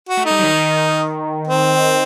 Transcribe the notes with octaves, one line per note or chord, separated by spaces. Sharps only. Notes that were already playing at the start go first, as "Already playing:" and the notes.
F#4
A3
D#4
G3
F#3
D#3
C4